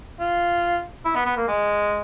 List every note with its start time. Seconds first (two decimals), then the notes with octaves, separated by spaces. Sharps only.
0.20 F4
1.05 E4
1.15 B3
1.26 B3
1.37 A#3
1.48 G#3